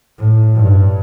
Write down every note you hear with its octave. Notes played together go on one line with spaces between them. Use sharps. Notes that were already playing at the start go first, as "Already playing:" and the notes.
A2
G2